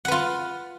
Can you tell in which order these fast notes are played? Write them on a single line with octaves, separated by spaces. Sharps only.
F#5 B4 F4